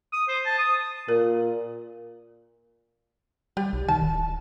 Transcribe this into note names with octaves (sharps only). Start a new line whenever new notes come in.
D#6
C5
A5
D#6
A#2 A#4
G3 G4
B1
D#3 A5
D1